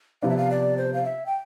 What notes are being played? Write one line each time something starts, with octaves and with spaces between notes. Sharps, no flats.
C3 F3 B3 D4 F5
E5
F5
D5
C5
F5
E5
G5